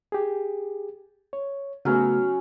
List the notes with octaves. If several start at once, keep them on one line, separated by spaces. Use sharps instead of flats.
G4 G#4
C#5
C#3 F#3 A3 B3 C#4